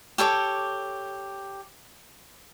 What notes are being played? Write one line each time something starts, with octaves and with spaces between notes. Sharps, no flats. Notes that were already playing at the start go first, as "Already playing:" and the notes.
G4 A4 C#5 D6